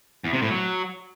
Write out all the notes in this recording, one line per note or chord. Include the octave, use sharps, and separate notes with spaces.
E2
C3
A2
F#3